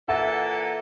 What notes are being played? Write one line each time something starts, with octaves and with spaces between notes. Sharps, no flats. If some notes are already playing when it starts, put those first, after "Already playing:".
A#2 E3 A4 E5 F#5